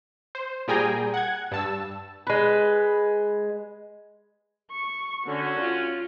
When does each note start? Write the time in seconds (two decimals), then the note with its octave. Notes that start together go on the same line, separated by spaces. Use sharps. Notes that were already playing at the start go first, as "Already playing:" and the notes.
0.35 C5
0.68 A#2 G3 G#4 G5 G#5 A#5
1.14 F#5 G#6
1.52 G2 A5 E6
2.27 G#3 B4
4.71 C#6
5.26 D3 C#4 F#4
5.59 F4